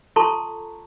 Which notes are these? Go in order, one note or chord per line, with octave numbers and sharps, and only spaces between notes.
F4 A4 A5 A#5 C6 C#6